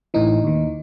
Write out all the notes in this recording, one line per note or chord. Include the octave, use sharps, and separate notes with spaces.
A1 A2 E3 D#4
D#2 D#3